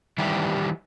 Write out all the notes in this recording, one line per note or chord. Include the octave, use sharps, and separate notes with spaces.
D#3 E3 G3 E4 G4